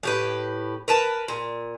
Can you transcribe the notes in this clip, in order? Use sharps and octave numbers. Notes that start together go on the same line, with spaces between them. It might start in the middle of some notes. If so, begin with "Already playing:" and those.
A2 G4 B4
A#4 B4 A5
A#2